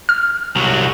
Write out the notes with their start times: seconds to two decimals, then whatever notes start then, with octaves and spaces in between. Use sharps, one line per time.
0.09 F6
0.56 C2 F#3